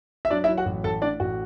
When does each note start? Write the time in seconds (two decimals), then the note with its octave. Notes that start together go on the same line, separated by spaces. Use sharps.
0.25 E5
0.30 F#3 D4 D5
0.44 E4 E5
0.48 F#3
0.57 F#4 F#5
0.66 A1
0.84 A1 A4 A5
1.02 A2 D4 D5
1.20 A1 F#4